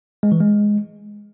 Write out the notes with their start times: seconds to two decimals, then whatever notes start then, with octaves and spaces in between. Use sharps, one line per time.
0.23 G#3
0.32 E3
0.40 G#3